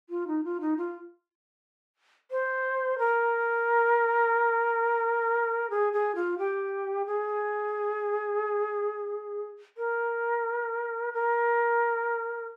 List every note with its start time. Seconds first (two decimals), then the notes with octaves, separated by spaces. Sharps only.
0.09 F4
0.27 D#4
0.44 F4
0.61 D#4
0.77 F4
2.31 C5
2.98 A#4
5.70 G#4
5.93 G#4
6.15 F4
6.38 G4
7.06 G#4
9.77 A#4
11.14 A#4